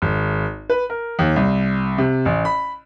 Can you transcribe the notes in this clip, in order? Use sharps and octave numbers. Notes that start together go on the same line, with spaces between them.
G#1
B4
A#4
D#2
C2
C3
A1
B5